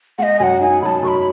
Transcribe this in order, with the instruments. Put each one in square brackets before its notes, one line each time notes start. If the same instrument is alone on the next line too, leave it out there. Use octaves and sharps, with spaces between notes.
[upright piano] G#3 [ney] D#5 F#5
[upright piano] F#2 [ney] F#5 G#5
[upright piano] D#4 [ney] G#5
[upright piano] F#2 [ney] A5 B5
[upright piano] F#2 [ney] C#6
[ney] B5